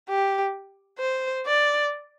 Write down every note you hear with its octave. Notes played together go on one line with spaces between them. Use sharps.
G4
C5
D5